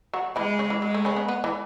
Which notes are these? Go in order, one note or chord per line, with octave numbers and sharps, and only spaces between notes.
F#3 F#4
E3 G#3 E4
C#3 C#4
E3
F#3 G#3
A3
C#3 C#4
B3
B3
E3